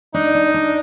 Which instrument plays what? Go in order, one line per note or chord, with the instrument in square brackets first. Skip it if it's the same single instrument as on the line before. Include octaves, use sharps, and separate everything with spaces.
[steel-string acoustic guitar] D4 [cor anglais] D#4
[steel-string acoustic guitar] D4
D4